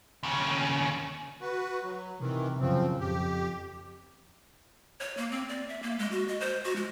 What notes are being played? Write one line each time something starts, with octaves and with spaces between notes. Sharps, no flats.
D#2 C#3
F#4 B4
F#3
C3 D#3 E3
F#2 C#3 F3 C4
F2 G4
C#5
A#3
C4
D5
E5
A#3
G#3
F#4
D#5
C5
F#4
G#3